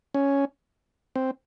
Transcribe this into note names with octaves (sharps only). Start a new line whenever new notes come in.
C#4
C4